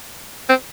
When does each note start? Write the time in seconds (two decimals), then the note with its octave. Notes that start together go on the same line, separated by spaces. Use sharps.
0.49 C4